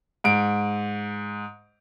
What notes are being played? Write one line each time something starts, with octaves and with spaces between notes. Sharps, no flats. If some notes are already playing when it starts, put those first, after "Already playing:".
G#2 D7